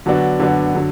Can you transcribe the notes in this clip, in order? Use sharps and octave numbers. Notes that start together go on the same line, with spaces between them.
D3 F#3 B3 D4 F#4
D3 F#3 B3 D4 F#4
D3 F#3